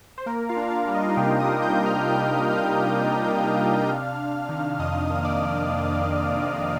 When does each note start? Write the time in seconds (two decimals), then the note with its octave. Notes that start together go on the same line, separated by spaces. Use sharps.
0.18 C5
0.26 A#3 A#4
0.49 F4 F5
0.57 D4
0.71 F4 F5
0.87 G3
0.95 D#5
1.01 F5
1.09 D#4 D#5
1.17 C3 G4 G5
1.39 D#5 D#6
1.47 D4
1.62 G5 G6
1.77 G3
1.85 F5 F6
2.08 D4 G5 G6
2.38 A#3 G6
2.53 F5 F6
2.68 C3
2.99 D4
3.28 A#3
3.59 D4
3.89 C3
4.19 C3
4.49 D#3
4.79 F2 D#5 D#6
5.10 A#3 D#6
5.24 D5 D6
5.40 D#3
5.70 F2
6.00 F2
6.31 C3
6.60 C3